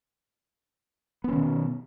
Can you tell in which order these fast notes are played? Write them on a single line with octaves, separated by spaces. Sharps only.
B3 C#4 D#3 B2